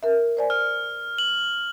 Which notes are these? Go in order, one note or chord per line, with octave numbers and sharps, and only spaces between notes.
A#4 E5
C5 D5 G#5
F6
F#7